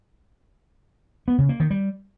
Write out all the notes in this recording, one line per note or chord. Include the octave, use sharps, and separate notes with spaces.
B3
C#3
A#3
D#3
G3